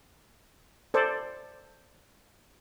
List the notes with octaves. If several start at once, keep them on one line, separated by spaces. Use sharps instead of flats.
A4 C5 D5